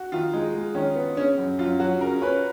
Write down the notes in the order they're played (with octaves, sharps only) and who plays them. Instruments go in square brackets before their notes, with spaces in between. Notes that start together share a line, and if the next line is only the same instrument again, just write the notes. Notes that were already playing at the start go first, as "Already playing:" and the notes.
Already playing: [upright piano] F#4
[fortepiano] D#3 [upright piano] F4
[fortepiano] G#3 [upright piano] D#4
[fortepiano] G#3
[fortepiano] D#3 [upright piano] C#4
[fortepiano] B3
[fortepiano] C#3 [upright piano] C#4
[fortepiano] F#2
[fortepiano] F#2 [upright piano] F4
[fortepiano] F#3 [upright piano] F#4
[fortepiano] C#3 [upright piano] A#4
[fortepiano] C#4 [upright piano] B4